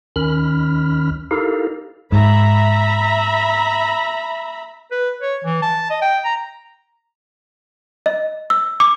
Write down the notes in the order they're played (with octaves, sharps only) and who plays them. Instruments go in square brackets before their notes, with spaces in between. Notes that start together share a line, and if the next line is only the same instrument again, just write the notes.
[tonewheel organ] D#2 D#3 C#4 B5 F6
D#4 E4 G4 A4 A#4 F5
[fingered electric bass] G#2 [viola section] E5 A#5 B5
[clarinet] B4
C#5
E3
A5
D#5
G5
A#5
[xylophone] D#5
E6
D6